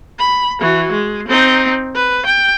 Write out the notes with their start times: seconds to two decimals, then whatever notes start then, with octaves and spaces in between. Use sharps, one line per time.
0.19 B5
0.60 E3 F#4
0.92 G#3
1.28 C4 D#4
1.95 B4
2.26 G5